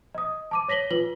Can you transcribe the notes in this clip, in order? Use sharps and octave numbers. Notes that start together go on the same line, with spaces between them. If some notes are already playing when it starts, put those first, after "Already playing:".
D#5 D#6
A5 D6 D#7
C#5 A#6 B6 F#7 G7
F4 B4 F#7 G7